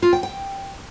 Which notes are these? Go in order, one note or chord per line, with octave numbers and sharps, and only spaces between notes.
F4
G5
G5